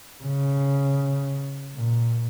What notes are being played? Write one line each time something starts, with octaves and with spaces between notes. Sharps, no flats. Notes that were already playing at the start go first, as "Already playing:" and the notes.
C#3
A#2